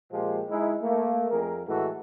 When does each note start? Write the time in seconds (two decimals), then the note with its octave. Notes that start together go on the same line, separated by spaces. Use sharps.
0.12 A#2 F3 G#3 G4 C5
0.50 G#3 D#4 E4
0.82 A3 A#3
1.30 F2 G#4 A#4
1.67 A2 E3 G#3 F#4 A4